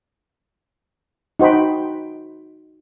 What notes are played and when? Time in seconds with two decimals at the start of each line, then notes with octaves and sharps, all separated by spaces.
1.39 D#4 F#4 C5 G5 B5